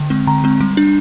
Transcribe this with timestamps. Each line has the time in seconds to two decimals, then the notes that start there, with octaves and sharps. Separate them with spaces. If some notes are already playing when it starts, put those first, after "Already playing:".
Already playing: D3
0.10 G#3 C4
0.27 D3 A#5
0.44 G#3 C4
0.61 G3
0.77 D4